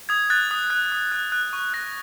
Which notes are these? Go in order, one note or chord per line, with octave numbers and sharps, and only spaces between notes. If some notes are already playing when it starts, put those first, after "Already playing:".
D#6 G#6
F#6 A6
D#6
F#6
D#6
F#6
F#6
C#6
F#6 A#6